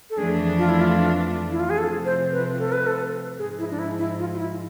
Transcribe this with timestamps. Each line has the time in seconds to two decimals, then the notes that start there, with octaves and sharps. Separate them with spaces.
0.10 A4
0.18 F2 E3 A3 D4 G#4
0.58 F4
0.69 E4
0.80 F4
1.51 E4
1.60 F4
1.70 G#4
1.78 C3 F3 A3 C4 F4 A4
2.06 C5
2.32 B4
2.59 A4
2.72 B4
2.87 A4
3.39 G#2 F3 G#3 G#4
3.59 E4
3.71 D4
3.79 E4
3.98 E4
4.19 F4
4.34 F4
4.39 E4